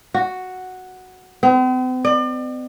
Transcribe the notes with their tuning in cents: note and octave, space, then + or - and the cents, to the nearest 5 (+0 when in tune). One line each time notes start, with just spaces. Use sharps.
F#4 +0
C4 -45
D5 +40